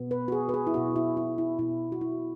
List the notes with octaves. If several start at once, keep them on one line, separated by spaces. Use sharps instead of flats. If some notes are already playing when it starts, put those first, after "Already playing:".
Already playing: B2 B3
B4
F#4
G#4
B4
G#4
E4
B2 B3 F#4
E4
E4
E4
B2 B3 E4
F#4
E4